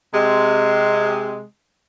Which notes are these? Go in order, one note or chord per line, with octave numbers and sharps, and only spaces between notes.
C3 G#3